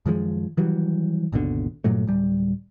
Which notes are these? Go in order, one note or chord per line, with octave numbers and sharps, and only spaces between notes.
F#2 D#3 F3 G#3
D#3 E3 F#3 G3
G#1 D#2 B2 D3
G2 A#2 F#3 A3
D1 G3